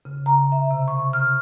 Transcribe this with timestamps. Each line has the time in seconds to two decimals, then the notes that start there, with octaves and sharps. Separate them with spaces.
0.05 C#3
0.26 A#5
0.52 E5
0.71 C3
0.88 C#6
1.13 F6